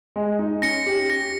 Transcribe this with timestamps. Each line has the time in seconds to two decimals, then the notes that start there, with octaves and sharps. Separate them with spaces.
0.16 G#3
0.39 D#4
0.62 C#4 A#6 C#7
0.86 G4
1.09 G4 A#6